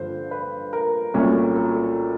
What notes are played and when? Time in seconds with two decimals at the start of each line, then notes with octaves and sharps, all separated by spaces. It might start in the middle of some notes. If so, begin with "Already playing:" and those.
Already playing: G2 D3 F3 C5
0.31 B4
0.73 A#4
1.14 C2 A#2 F#3 A3 C#4
1.56 A4